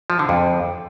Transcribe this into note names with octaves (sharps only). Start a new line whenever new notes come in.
F3
D3
F2